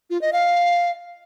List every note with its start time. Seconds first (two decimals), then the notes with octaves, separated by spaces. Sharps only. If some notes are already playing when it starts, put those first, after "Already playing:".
0.10 F4
0.21 D#5
0.33 F5